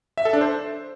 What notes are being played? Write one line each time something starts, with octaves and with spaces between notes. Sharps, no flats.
E5
A4
D4
C5